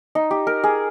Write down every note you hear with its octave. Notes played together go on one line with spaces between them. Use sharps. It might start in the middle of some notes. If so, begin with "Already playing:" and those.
D#4
G4
A#4
G#4